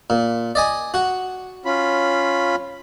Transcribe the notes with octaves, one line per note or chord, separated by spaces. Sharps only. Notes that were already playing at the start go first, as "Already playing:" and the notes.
A#2
D5 D#5 G#5
F#4 F#5
C#4 F4 B5